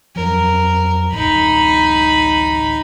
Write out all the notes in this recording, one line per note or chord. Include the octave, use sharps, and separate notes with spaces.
F2 F3 F#3 A#4
D1 A1 D#4 B5